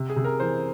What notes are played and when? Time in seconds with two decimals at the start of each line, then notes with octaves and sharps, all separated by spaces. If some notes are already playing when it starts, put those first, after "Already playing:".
Already playing: C3
0.10 G#4
0.16 C3
0.24 A#4
0.40 E3 C5